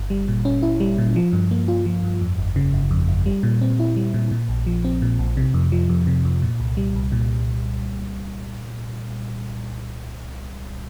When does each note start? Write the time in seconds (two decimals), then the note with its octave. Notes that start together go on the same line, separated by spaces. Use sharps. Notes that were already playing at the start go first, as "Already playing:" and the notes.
Already playing: G1
0.10 G3
0.28 A#2
0.45 C#4
0.62 E4
0.80 G3
0.98 A#2
1.16 F3
1.33 G2
1.51 A#3
1.68 F4
1.86 F3
2.03 G2
2.21 F2
2.38 G1
2.56 C#3
2.73 G1
2.91 F2
3.08 G1
3.26 G3
3.43 A#2
3.62 C4
3.79 E4
3.97 G3
4.14 A#2
4.31 A#2
4.49 A#1
4.67 F3
4.84 C4
5.02 A#2
5.19 A#1
5.37 C3
5.54 F2
5.72 F3
5.89 F2
6.07 C3
6.25 F2
6.42 A#2
6.60 C2
6.77 G3
6.96 C2
7.12 A#2